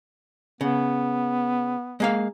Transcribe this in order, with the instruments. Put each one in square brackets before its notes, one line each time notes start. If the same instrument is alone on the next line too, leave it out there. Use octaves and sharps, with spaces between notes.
[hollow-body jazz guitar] C#3 [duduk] B3
[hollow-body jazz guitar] G#3 A#3 F5